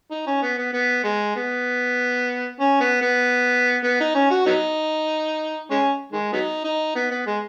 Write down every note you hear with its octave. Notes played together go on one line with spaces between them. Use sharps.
D#4
C#4
B3
B3
B3
G#3
B3
C#4
B3
B3
B3
D#4
C#4
F#4
F#3 B3 D#4
G#3 C#4
D#3 G#3
F#3 B3 D#4
D#4
B3
B3
G#3